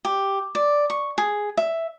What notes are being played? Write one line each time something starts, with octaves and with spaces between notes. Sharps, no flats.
G4
D5
C#6
G#4
E5